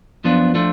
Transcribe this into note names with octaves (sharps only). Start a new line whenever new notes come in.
F#2 F3 B3 D4 F4
F3 A3 D4 F4